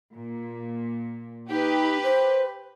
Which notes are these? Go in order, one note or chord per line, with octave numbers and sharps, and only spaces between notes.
A#2
D#4 G4 B4
C5